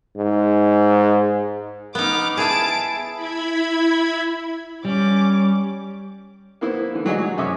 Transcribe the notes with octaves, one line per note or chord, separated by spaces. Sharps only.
G#2
B3 D#4 D6 F6
E4 G#4 A5 D7
E4 B5 G#6
G3 C#4 D6
A#3 B3 E4 C5
D3 E3
E3 F#3 F#4 G#4 D5 D#5
F#3
F#2 C3 C#4 E5 D6 D#6